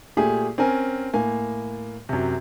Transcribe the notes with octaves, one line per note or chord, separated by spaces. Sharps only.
A#2 A3 G4 G#4
C4 C#4 A#4 G#5
A2 A#3 G#5
F#2 C3